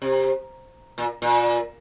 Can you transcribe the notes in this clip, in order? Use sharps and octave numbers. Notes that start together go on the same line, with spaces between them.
C3
A#2
A#2